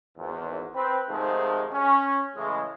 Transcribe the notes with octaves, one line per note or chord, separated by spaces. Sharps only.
G#1 E2
C4 B4
G#2 C3 D#3 F3 G#3 A3
C#4
A2 C#3 E3 G#3